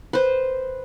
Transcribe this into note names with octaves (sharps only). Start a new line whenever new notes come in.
B4 C5